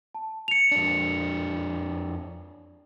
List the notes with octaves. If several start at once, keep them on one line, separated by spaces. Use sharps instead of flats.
A5
C#7 F7
F2 D4